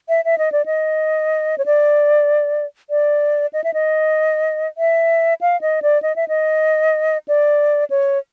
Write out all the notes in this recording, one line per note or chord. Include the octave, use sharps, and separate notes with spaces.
E5
E5
D#5
D5
D#5
C#5
D5
D5
D#5
E5
D#5
E5
F5
D#5
D5
D#5
E5
D#5
D5
C#5